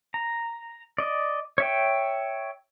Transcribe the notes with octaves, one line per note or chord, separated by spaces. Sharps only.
A#5
D5 D#5
C#5 E5 G5